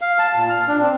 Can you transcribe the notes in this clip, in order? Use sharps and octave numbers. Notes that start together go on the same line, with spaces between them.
F5
A5
A#2
F6
D4
C4